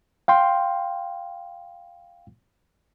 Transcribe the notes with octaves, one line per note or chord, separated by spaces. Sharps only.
F5 G5 C6